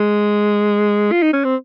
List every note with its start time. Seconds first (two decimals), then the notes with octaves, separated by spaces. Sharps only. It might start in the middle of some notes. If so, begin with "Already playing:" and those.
Already playing: G#3
1.12 F4
1.23 D#4
1.33 C#4
1.45 C4